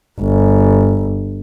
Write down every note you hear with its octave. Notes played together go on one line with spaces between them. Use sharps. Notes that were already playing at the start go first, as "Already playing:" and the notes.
G1